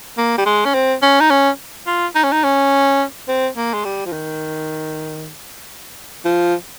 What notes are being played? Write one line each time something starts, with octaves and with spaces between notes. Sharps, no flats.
A#3
G3
G#3
C#4
C4
C#4
D#4
C#4
F4
D#4
C#4
D#4
C#4
C4
A#3
G#3
G3
F3
D#3
F3